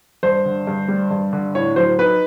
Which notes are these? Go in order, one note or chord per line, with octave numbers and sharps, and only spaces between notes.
G2 C5
D3
G2
G3
G2
D3
A2 C#5
F#3 C5
D#4 B4